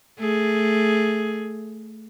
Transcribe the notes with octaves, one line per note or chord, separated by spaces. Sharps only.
A3 G#4